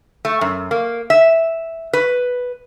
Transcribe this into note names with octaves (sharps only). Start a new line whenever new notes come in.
A3
F#2
A#3
E5
B4